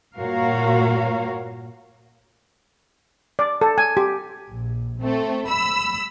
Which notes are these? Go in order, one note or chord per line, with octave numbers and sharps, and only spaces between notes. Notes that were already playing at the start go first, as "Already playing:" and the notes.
G2 A#2 F#4 A#4 C#5 F5
D5
A4
G#5
G4
A#1
A3 C4
B5 E6